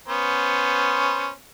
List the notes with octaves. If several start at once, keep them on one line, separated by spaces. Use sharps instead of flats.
B3 C#4 C5